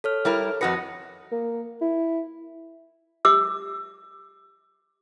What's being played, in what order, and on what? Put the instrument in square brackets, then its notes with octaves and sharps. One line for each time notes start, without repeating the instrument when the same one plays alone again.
[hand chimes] A4 C#5 F6
[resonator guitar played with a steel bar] G3 E4 A#4
[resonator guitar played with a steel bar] F2 F#4 B4 [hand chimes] D#6 A#6 C#7
[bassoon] A#3
E4
[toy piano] G4 D6 E6